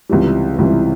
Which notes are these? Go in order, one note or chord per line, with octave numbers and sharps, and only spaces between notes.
C#2 C3 E3 G3
C#2 C3 E3 G3